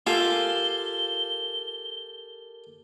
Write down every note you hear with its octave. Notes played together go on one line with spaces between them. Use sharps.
F4 G4 A4 A#4 G#5 A5 G7